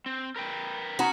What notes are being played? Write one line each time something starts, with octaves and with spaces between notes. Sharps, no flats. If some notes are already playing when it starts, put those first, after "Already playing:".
C4
A#4 B4 G5
B3 C#4 D#4 F#4 A#5